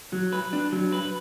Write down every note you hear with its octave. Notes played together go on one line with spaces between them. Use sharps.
F#3
B4
D4
F#3
B4